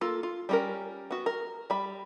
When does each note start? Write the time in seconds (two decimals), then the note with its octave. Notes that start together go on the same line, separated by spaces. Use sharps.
0.01 A#3 F4 A4
0.23 F4
0.49 G3 C#4 A#4
1.11 B3 F#4
1.26 A#4
1.70 G3 B5